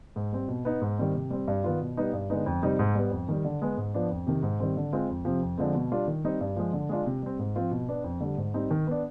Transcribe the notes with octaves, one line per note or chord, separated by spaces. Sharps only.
G#2
G3 C4
B2
B3 D#4
G#2
D#3 G3 C4
C3
G3 C4
G2
D#3 B3 F4
B2
G3 B3 D#4
G2
D3 G#3 B3 D#4
F2
C3 G3 C4 D#4
G#2
G3 B3
F2
D#3 G3
D3
G#3 B3
G#2
F3 B3 D4
F2
C3 D#3
G#2
D#3 G3 C4
D3
G#3 C4 F4
F2
C3 F3 C4
F2
D3 F3 G#3 C4
B2
G3 D4 F4
D#3
G3 C4 D#4
G2
F3 G#3
D3
G#3 D4 F4
C3
G3 C4
G#2
F3 C4 F4
B2
B3 D4
F2
D3 G3
G#2
G3 C4 D#4
D#3
B3 D4